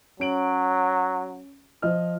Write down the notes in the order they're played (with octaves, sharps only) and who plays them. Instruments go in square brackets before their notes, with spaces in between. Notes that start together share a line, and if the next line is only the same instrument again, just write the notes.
[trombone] F#3 [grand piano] C#4 D7 F#7
[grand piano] F3 D#5 F6